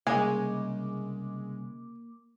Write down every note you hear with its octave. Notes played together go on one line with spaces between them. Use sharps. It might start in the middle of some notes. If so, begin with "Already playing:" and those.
C2 C#3 G#3 A#3 C#5 G#5 D6